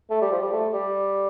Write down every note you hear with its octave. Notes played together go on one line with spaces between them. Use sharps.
A3
G3
F3
G3
A3
G3